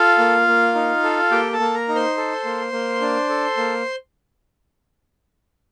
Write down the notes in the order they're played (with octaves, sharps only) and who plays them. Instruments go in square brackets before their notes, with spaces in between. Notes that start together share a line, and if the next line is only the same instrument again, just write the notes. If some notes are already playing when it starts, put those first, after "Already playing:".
Already playing: [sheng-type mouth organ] F4 A4 F5
A#3
A#3
D#4
A4
A#3 G4 G5
A4 A5
A#3
A#4 A#5
D#4
C5 C6
A4
A#3
A#3
D4
A4
A#3